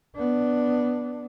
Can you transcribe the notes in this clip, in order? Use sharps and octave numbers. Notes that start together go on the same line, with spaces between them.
B3 D4